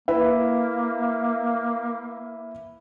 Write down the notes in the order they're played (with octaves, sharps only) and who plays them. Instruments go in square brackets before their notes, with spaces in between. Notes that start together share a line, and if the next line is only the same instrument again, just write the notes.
[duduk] A#3 [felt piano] E4 B4 E5